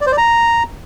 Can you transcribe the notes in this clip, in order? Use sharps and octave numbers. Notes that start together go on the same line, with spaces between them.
D5
C5
D5
A#5